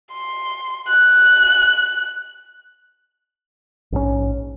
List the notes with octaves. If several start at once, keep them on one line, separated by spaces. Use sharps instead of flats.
C6
F#6
A#1 G#2 D3 C#4